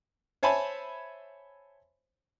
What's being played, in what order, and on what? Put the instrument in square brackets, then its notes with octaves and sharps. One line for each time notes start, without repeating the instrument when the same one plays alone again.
[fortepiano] C5 C#5 E5 G#5 A5 B5